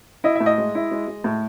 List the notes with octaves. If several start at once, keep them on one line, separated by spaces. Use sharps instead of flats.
E4 D#5
A2 E5
D#5
G#3
E4
G#3
G#3
A2